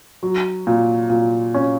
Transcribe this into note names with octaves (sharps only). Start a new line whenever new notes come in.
F#3
A#2
A#2
C#4